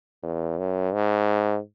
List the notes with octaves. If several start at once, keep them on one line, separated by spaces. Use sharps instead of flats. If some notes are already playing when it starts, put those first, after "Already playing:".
E2
F#2
G#2